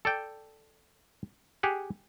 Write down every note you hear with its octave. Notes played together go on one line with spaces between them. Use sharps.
A4 D5 G5
G4 G#4 F#5